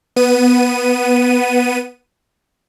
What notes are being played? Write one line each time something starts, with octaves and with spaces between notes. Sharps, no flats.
B3 D#7